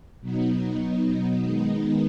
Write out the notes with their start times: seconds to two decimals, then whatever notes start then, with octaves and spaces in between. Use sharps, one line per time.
0.20 B2 F#3 B3 D#4
1.41 D#3 G#3 B3 D#4